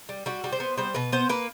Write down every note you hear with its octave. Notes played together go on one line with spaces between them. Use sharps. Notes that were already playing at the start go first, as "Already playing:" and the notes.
G3
G3 F#4
G3
C5
B3
G3 C5
B2 B4
B3 C5
A#3 B4